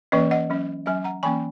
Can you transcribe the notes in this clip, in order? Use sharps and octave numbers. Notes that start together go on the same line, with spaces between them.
E3 A#3 C#4 B4 D#5
D#5 F#5
F#3 C#4
F#3 C#4 E5 G#5
F#5 A#5
E3 A#3 C#4 G#5 B5